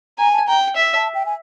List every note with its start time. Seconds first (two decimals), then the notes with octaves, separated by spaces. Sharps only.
0.18 G#5 A#5
0.33 A5
0.47 G5 A#5
0.76 E5
0.95 A5
1.15 G5
1.26 G#5